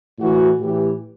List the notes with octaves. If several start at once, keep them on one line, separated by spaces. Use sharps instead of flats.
A2 E3 F#4
A2 E3 G4